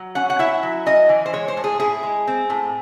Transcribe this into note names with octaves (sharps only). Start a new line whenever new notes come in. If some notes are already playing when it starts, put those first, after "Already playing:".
Already playing: F#3
C#4 F#5
F#5
E4 E5
F#3
C#4 D#5
E3
C5
G#3 C#5
C5
A2
G#4
E4 G#4
G#3
C4
A2